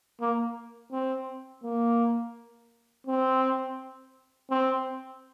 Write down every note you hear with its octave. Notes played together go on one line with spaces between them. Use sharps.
A#3
C4
A#3
C4
C4